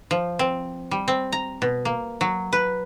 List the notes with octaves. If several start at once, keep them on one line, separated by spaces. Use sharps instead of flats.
F3
C4
G3
C4
A#5
B2
A#3
F#3
B4